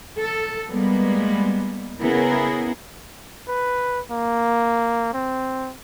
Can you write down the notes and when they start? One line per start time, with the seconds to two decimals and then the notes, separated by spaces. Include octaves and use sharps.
0.19 A4
0.69 G3 G#3 A#3 B3
2.01 C#3 B3 E4 G#4 A#4
3.48 B4
4.11 A#3
5.14 C4